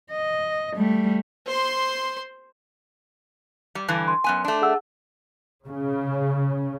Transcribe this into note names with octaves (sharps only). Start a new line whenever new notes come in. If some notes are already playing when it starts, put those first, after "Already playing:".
D#5
G3 A3
C5 C6
G3
G2 D3 E3
C6
F#2 B3 G#5
A3 D4
G#4 F#5 E6
C#3